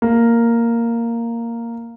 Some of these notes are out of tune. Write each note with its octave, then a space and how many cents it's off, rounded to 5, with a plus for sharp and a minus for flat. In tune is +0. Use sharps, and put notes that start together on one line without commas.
A#3 -5